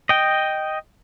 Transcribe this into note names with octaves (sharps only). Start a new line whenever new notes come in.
D#5 G5